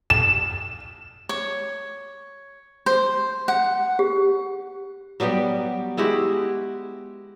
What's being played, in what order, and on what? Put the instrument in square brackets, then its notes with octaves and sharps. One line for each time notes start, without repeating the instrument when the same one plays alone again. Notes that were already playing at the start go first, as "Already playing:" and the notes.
[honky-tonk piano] E7
[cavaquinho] C#5
C5
F#5
[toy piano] G4
[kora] F#3 G3 B3 G4
G#3 E4 F#4 G4